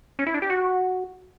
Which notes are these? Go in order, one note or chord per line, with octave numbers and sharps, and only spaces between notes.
C#4
E4
D4
G4
F#4